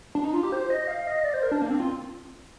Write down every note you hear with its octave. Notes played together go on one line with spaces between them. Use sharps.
D4
D#4
F4
G4
C5
D#5
F5
D#5
D5
C5
A#4
D4
A#3
C4
F4